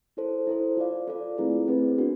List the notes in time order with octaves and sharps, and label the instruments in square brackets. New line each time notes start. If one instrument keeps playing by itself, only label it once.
[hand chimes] E4 A4 C5
E4 A4 C5
F4 A4 D5 F5
F4 A4 D5 F5
A3 C4 E4 G#4 B4
A3 C4 E4 G#4 B4
B3 D4 F#4 A#4